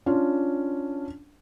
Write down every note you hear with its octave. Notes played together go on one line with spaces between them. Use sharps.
C#4 D4 F4